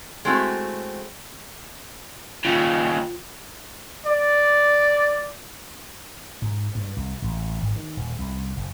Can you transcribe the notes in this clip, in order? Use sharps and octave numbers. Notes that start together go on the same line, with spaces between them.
G#3 A3 C4 E4 F#4
D#2 C#3 F4
D5
G#2
G2
C2
A1
G#1
D#3
D#1
C2
F#1